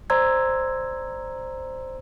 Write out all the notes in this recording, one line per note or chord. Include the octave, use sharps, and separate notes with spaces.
C5 D5 A#5 C6 E6 G#6